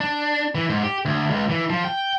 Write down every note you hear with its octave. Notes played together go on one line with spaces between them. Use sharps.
D4
E3
G#2
G4
D2
C#2
E3
F3
G5